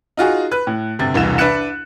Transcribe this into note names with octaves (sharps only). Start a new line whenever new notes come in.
D#4 F4 F#4 G#4
B4 F#6
A2
G1 C3 A6
E1 C2 E3 E7
D4 B4 E5 F#6 C#7 E7